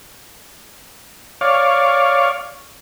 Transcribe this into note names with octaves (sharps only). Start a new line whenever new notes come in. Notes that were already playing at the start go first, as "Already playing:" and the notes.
C#5 D5 F5